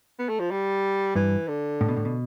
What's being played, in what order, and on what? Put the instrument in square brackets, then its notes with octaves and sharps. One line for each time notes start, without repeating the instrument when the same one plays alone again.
[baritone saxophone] B3
A3
F3
G3
[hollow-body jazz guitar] G2 [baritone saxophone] E3
[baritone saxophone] D3
[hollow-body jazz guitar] A2
B2
A2
B2